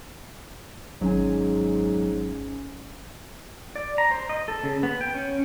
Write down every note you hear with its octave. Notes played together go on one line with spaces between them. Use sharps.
G#1 G#2 F#3 C#4 G#5
D5
A#5
C5
D#5
A4
C#3
B3
G5
C#4